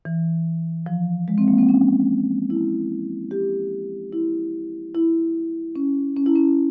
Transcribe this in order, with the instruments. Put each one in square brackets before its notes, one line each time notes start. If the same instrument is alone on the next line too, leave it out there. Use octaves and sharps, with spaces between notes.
[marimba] E3
F3
G#3
C4
A#3
C4
C#4
E4
G4
E4
E4
C#4
C#4
E4
C#4